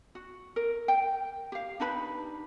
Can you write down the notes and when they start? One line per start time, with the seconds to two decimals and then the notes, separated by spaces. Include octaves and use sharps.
0.15 F#4
0.56 A#4
0.88 G5
1.52 G4 F5
1.80 D4 D#4 B4 B5